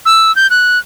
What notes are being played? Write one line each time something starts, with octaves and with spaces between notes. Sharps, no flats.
E6
G6
F#6